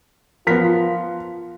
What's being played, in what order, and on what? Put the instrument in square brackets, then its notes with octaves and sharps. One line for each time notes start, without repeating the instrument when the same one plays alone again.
[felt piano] F3 B6 [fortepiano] B3 A#4 [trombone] F4